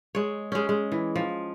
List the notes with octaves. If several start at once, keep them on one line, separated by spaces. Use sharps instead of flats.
G#3 C#5
G#3 C#4
G#3
E3
F3